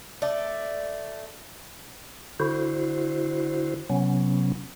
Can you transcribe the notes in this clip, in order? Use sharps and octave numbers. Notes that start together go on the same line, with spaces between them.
A3 D5
D3 E4 F#4 C5
C3 F#3 B3 C#4